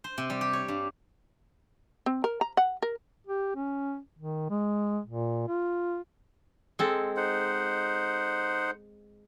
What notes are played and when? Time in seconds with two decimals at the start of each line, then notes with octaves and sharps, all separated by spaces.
0.04 C5
0.18 C3
0.30 G3
0.41 G4
0.53 C#5
0.68 G2
2.06 C4
2.24 A#4
2.41 A#5
2.57 F#5
2.82 A#4
3.27 G4
3.56 C#4
4.19 D#3
4.50 G#3
5.06 A#2
5.48 F4
6.79 G#3 C4 A4
7.17 D#4 C5 F#5